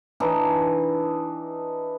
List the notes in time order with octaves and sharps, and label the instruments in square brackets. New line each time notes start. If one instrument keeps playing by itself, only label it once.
[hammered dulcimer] E3 D4 D#4